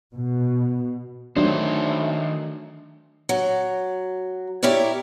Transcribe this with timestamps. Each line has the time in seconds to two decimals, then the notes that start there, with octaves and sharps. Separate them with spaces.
0.13 B2
1.37 D#3 F#3 A3 D4 C5
3.29 F#3
4.63 E4 G4 A#4 C#5 D5